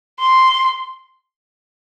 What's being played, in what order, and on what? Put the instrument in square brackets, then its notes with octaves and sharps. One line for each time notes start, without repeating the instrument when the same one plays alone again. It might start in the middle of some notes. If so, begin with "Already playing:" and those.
[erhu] C6